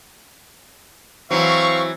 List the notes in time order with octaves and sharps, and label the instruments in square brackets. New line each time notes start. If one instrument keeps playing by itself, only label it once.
[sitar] E3 F#3 [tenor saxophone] C4 [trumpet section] F5 C#6